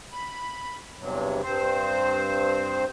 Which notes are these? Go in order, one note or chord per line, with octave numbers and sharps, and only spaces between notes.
B5
E2 G2 C3 F#3
G2 C4 C5